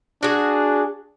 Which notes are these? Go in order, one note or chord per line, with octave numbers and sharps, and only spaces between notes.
D4 F#4 G#4